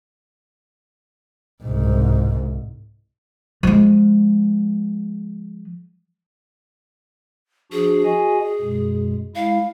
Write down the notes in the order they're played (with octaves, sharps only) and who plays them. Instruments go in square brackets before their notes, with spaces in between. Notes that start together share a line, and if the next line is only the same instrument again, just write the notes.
[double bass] C2 G#2
[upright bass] F3 G#3
[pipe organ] F3 D4 F#4 [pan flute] G#4
[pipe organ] F#4 D#5 G#5
F#2 B2 G#3
[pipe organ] G#3 E4 [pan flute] F5